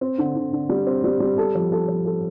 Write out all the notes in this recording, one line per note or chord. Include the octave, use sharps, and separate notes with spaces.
C4
D3
D3
D3
G3
C4
G3
G3
A4
F3
A4
F3
A4